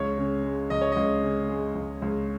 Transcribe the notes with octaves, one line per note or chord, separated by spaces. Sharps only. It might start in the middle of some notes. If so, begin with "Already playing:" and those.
Already playing: C#2 C#5
C#3
G#3
C#2 D#5
C#5
C#2 D#5
C#3
G#3
C#2
C#2